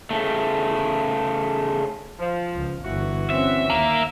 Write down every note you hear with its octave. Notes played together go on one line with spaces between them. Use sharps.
C#3 A3
F3
C#2
G1 E3 F#4
C4 C#4 E5
D#2 A#3